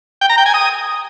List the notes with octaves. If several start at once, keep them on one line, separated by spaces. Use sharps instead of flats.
G5
A#5
G5
G#5
D#6